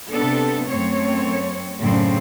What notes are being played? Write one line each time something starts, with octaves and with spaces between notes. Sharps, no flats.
C3 B3 D4 A4
F#2 A3 C4 C#5
F#2 A2 C#3 C4 D4